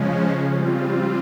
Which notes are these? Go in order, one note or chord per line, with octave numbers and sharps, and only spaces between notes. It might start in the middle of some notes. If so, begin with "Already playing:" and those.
Already playing: C#3 F3 G#3 C#4
G3 C4 F4